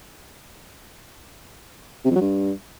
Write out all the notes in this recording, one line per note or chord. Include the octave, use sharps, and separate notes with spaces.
C3
F2
F#3
G2